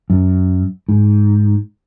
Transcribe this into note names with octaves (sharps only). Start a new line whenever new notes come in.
F#2
G#2